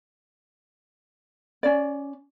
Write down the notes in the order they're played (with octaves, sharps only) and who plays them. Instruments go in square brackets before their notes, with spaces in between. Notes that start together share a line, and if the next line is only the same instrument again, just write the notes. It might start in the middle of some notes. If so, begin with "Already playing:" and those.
[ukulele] C#4 D5